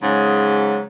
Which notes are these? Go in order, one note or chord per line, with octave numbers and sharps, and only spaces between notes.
G#2 C#3 F#3